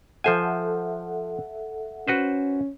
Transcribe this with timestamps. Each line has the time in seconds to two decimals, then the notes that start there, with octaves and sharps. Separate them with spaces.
0.24 F3 A4 C5 E5 F#5 G#5
2.08 C#4 F#4 B4 C5